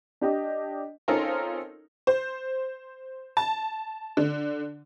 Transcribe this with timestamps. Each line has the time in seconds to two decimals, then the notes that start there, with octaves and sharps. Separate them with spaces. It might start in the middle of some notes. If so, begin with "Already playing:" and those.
0.21 D4 G4 D#5
1.08 C4 C#4 D#4 F4 A4 A#4
2.07 C5
3.37 A5
4.17 D3